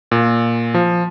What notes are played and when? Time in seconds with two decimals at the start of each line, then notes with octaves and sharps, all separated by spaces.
0.11 A#2
0.74 F3